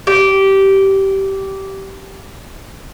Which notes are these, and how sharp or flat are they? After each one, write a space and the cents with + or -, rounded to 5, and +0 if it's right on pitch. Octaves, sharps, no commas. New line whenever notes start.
G4 -15